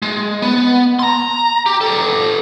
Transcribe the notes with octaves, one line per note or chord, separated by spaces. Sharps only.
G#3
B3
A#5 C6
G4
G4 A4